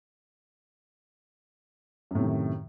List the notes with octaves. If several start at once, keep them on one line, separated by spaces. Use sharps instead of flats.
F#2 A2 C3 D#3